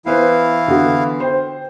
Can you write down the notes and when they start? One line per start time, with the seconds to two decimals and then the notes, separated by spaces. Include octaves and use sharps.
0.06 E3 B3 E4 B4 C5 F5
0.68 D3 B3 F#4
1.20 C5 G5